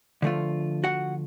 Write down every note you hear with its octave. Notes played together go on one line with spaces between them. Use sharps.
D3 F3 A3 F4
F#4 F#5